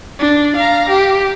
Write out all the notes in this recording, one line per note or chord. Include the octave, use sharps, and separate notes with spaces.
D4
F5 A#5
G4